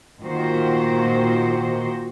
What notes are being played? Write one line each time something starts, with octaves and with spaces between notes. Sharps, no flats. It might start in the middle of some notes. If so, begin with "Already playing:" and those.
A#2 D#3 F#4 C5